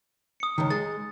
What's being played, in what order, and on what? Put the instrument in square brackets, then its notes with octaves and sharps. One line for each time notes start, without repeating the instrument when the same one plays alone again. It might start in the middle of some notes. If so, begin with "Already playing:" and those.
[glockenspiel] D#6 C#7
[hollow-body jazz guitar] C#2 D#3
[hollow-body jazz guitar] G#3 [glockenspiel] A6